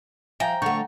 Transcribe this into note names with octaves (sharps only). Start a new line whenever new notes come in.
F3 E5 G5 G#5 A#5
D3 A3 F#5 C#6 G6